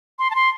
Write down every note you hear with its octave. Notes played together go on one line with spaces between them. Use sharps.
C6
A5
C6